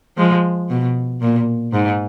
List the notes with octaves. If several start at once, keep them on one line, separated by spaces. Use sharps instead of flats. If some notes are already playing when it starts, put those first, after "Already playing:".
F3 G#3
B2
A#2
G#2